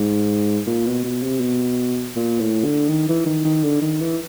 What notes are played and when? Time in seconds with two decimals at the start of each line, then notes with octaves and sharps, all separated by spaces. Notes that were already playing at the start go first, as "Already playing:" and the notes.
Already playing: G#2
0.67 A#2
0.86 B2
1.04 B2
1.23 C3
1.41 B2
2.16 A#2
2.40 A2
2.65 D3
2.89 D#3
3.09 E3
3.26 D#3
3.45 D#3
3.64 D3
3.82 D#3
4.02 E3